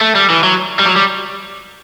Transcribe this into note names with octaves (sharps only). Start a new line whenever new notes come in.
A3
G3
E3
F#3
G3
F#3
G3